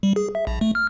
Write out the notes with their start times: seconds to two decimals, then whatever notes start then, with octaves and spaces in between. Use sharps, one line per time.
0.03 G3
0.16 G#4
0.35 E5
0.47 A#1
0.61 A3
0.75 F6